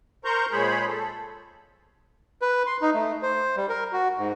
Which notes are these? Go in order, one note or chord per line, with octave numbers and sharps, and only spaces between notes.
A#4 C5 A#5 C#6 G6
A#2 G#3 G#4 C5 C#5 B5
A4
B4
C6
D#4
A3
C5
G3
A#4
F#4
G#2